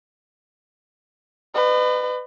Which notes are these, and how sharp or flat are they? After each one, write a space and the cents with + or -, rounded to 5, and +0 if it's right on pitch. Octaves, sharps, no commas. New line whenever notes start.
B4 +25 D#5 -40